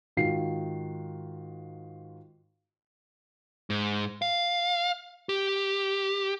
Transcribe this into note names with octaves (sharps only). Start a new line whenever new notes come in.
G#2 D#3 F4 F#4 F5 C7
G#2
F5
G4